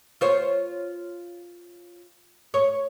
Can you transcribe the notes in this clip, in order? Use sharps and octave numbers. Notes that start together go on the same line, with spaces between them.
F4 C5 C#5
C#5